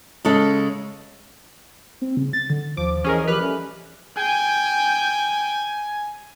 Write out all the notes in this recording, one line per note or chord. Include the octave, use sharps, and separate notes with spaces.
C#3 G#3 A4
C4
C#3
A6
D3
D#2 F3 D6
E3 C#4 G#4 A#4 D#5
A#2 G4 B4 F6 F#6
G3 A3 C#4
G5 G#5